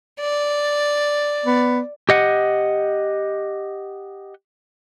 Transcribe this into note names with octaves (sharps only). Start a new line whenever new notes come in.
D5
B3
G4 D#5 F#5